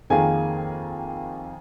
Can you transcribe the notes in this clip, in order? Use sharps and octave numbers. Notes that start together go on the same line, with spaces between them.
F2 D#3 A#3 G#4 G#5